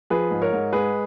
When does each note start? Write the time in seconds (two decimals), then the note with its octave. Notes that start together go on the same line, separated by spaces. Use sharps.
0.10 F3 G#4 B4
0.31 G#2
0.42 A#4 C#5
0.52 G#2
0.73 G#3 G#4 B4